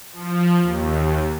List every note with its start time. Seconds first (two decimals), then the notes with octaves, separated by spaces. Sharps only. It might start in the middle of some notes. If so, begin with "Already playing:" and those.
0.12 F3
0.61 D#2